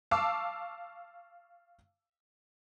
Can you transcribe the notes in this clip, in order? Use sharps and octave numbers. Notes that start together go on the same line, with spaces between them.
F5 A5 C#6 D6 E6